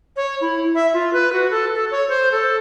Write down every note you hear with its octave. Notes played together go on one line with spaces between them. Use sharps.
C#5
E4
E5
F4
B4
F#4
A4
A4
C#5
C5
A4